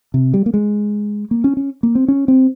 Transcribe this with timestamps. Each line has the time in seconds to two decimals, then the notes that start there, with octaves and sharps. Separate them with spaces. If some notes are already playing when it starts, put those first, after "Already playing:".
0.14 C3
0.34 G3
0.46 A#3
0.54 G#3
1.31 A#3
1.44 C#4
1.57 C#4
1.83 A#3
1.95 C4
2.08 C#4
2.28 C4